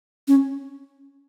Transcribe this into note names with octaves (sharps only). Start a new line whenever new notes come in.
C#4